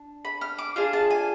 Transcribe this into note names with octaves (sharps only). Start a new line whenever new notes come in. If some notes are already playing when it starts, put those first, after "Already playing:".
Already playing: D4
B5
F6
D6
D4 F4 G#4 F6
A5
G#5